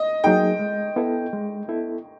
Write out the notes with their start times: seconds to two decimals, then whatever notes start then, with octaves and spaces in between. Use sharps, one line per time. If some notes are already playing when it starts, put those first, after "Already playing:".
Already playing: D#5
0.24 F#3 A#3 D#4 G#4 G5
0.59 G#3
0.96 B3 E4 A4
1.33 G#3
1.68 B3 E4 A4